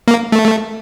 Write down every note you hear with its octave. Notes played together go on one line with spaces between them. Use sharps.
A#3
A3